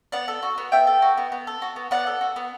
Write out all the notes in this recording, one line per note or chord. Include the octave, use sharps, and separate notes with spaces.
B3 D5 F#5
A4
F#4
B3
B3 E5 G5
A4
F#4
B3
B3
A4
F#4
B3
B3 D5 F#5
A4
F#4
B3